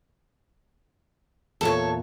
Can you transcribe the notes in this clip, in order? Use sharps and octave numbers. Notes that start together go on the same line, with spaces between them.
E2 A#2 A4 C#5